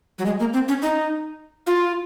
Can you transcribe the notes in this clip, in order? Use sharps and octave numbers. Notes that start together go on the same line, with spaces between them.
F#3
G#3
A#3
C4
C#4
D#4
F4